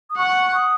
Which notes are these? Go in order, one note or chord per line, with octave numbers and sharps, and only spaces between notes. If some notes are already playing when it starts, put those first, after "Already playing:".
D#6
F#5 C#6
D#6